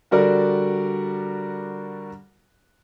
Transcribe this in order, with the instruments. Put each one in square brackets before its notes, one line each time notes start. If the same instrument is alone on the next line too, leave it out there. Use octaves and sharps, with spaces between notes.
[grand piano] D3 G3 F#4 A#4 D5